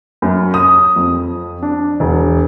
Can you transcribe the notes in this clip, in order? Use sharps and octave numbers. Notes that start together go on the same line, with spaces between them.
F#2
D#6
F2
D4
E1